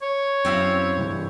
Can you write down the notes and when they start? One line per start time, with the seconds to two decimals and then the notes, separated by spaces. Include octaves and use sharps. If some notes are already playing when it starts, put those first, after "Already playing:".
0.02 C#5
0.45 F#2 C4 E4 F5
0.97 G2 C3 E3